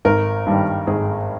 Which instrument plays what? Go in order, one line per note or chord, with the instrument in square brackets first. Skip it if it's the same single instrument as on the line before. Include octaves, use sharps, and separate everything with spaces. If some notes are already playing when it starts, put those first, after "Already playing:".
[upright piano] G#1 A#4
G2 D#3 G3
G#1 G#4